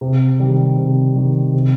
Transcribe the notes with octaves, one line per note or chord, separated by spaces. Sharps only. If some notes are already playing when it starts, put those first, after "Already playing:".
C3
D#3 G3
C3
D#3 G3
C3